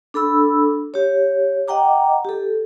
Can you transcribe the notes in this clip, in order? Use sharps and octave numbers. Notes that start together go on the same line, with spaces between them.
D4 A4 B5 E6
G4 C#5
D#5 F#5 G5 A#5 D6
G4 A4